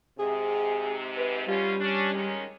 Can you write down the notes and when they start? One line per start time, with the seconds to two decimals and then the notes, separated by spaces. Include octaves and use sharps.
0.19 G#2 C3 G#4
1.18 B4
1.48 B2 G3 C#4 F4
1.81 C#4 D4
2.13 D#3 G#3 C#4